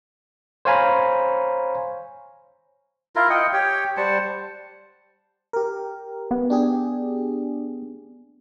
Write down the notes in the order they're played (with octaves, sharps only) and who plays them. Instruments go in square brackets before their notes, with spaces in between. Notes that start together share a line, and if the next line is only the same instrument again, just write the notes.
[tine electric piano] C5 C#5 F5 G#5 A#5 B5
[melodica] E4 F4 A#4
D#5 F#5 G5
G4 C#5 G5
G3 C5 F#5 A5
[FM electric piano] G4 A#4
[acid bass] B3
[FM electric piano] D4 G4 G#4